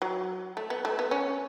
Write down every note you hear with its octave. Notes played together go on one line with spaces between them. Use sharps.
F#3
A3
B3
A3
B3
C#4